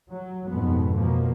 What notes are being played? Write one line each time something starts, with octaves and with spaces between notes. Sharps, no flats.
F#3
F2 G#2 B2 B3
B2 F3 A#3